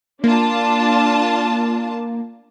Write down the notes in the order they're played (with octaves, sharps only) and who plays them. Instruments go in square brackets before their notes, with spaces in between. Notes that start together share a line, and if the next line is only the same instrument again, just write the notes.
[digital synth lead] A#3 [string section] D4 F4 A5